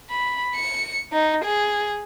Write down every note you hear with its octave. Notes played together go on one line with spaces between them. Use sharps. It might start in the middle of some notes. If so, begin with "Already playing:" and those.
B5
C#7
D#4
G#4